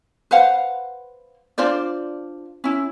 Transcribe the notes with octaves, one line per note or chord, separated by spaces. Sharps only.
B4 C5 F5 F#5
D4 F4 C5 D5
C#4 E4